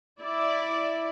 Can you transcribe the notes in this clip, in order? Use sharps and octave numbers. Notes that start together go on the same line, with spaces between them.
E4 D5